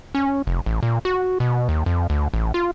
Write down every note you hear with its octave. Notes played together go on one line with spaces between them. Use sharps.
C#4
F1
A1
A#2
F#4
B2
D#2
F2
D2
A1
F4